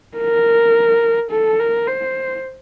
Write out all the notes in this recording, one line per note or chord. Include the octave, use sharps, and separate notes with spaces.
A#4
A4
A#4
C5